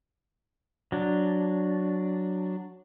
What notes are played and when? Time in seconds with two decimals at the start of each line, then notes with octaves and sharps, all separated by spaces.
0.92 F#3 D4